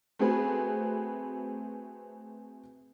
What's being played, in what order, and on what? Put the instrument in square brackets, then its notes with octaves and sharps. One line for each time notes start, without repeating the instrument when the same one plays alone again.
[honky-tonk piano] A3 C4 F#4 G#4 B4